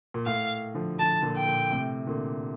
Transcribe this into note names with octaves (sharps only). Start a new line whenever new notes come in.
A#2
A2 F5
D3 F3
D3 F3 A5
A#2 D3
G5
A#2
A2 C3
A#2 D3